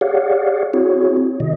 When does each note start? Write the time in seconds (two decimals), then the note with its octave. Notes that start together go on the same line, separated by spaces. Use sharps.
0.01 G4 G#4 C#5 D5 F5 F#5
0.74 C4 E4 F#4 G#4 C#5
1.40 C3 D#3 D#5